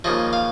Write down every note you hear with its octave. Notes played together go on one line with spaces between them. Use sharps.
D#2 C#3 F3 D#5
F5